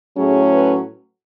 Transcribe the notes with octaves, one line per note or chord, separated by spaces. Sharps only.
A2 F#3 A3 C#4 G#4
B4